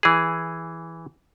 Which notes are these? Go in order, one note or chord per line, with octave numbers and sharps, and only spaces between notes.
E3 G#4